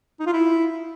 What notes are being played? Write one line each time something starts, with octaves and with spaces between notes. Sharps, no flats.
D#4
F4
E4